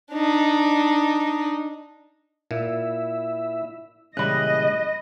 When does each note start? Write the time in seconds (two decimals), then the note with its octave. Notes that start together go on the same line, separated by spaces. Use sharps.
0.12 D4 D#4
2.51 A#2 E4 E5
4.17 A#2 C#3 E3 G3 G#3 D#5 B5 F#6